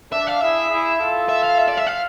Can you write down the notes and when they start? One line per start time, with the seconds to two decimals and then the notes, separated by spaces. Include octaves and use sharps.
0.12 D4 E5
0.27 F5
0.41 E4 G#4 E5
0.70 E4 G#4
1.00 F4 A4
1.29 E5
1.44 F5
1.58 E5
1.69 D5
1.78 E5
1.87 F5